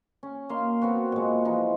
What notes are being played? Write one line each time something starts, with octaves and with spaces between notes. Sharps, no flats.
C#4
A#3 F5 C6
B3 C4 F#4
A#2 G#3
E3 F3 D#4